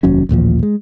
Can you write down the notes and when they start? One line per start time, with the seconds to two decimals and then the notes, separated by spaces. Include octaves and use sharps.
0.03 F1 D#2 F#3 C#4
0.29 A1 D#2 A#2 F3
0.63 G#3